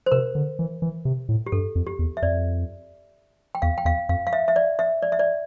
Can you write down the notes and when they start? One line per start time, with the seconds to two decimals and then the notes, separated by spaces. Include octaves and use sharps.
0.06 C5
0.12 C3 A#4
0.35 D3
0.59 E3
0.82 E3
1.05 C3
1.29 A2
1.46 G4
1.52 G2 A4
1.75 F2
1.87 G4
1.99 E2
2.17 E5
2.22 F2 D5
3.55 G5
3.62 E2 F5
3.78 G5
3.85 E2 F5
4.09 F2 F5
4.27 F5
4.33 E5
4.48 E5
4.56 D5
4.79 E5
5.02 D5
5.12 E5
5.19 D5